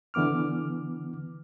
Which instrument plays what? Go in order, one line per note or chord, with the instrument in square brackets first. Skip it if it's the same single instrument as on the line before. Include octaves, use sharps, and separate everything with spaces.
[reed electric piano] D3 E3 B3 D6 F6